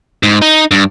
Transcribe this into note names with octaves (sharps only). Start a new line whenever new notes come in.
G#2
D#4
G2